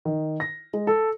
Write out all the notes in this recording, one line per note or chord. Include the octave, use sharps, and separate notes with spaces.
D#3
A#6
G#3
A4